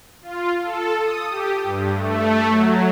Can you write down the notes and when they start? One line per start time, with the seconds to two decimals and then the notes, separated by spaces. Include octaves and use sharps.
0.22 F4
0.61 A4
1.00 D#6
1.30 G4
1.64 G2
1.94 A3
2.49 F#3